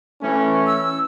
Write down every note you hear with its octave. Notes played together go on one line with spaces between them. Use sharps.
E3 A3 C#4
E6